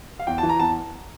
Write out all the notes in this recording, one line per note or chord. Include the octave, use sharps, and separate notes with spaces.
F5
E2 G5
A5
E3
A#5
E2 A5